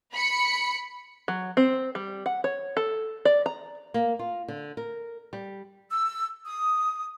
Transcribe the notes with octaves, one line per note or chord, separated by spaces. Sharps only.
B5 C#7
F#3
C4
G3
F#5
C#5
A4
D5
A#5
A#3
F4
D3
A#4
G3
E6
D#6